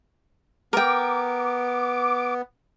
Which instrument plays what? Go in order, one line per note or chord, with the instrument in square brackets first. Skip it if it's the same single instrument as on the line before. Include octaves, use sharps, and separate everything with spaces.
[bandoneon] B3 [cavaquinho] A#4 G5 [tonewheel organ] D6